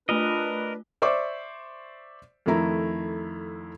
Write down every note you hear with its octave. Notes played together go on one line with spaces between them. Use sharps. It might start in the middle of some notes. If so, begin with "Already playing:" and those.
A3 D4 F4 A#4 B4 D#5
C5 D5 E5 C#6 D6
F2 D#3 A3 E4 A#5